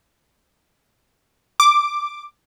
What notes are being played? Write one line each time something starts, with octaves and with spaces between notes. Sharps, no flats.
D6